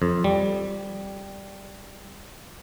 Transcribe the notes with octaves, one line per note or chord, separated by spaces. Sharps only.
F2
G3